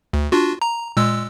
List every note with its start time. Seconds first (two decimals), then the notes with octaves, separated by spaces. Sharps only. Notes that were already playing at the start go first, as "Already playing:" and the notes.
0.13 D2
0.32 D4 F4 F#4
0.62 A#5
0.97 A#2 G#3 E6